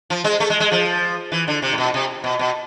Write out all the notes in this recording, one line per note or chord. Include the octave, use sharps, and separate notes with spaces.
F3
G#3
A3
G#3
G#3
F3
E3
D3
C3
A2
B2
C3
B2
B2